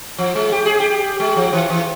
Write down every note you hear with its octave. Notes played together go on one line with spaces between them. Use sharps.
F3
G#3
G4
G#4
G4
G#3
F3
E3
E3